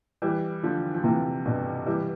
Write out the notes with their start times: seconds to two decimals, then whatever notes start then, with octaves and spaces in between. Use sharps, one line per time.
0.22 E3 G3
0.63 D3 F3
0.94 F3
1.04 C3 E3
1.46 G2 B2
1.86 E3 G3